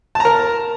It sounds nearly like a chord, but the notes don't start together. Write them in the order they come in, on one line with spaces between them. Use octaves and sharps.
A5 A#5 A#4